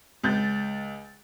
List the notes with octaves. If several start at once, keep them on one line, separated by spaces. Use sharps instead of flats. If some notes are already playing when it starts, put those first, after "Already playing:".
C#2 G6 A6